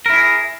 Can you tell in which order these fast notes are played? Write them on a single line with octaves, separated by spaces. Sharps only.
A#4 E4 G#4